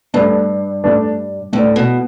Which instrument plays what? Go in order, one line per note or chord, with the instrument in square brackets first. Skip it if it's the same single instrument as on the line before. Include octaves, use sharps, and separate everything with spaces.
[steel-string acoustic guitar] G2 [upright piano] A3 D4 B4 D5
[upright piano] A3 D4 B4 D5
[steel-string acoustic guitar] A2 [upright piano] A3 D4 B4 D5
[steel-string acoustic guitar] B2